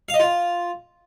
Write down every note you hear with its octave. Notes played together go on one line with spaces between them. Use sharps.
F5
D#5
F4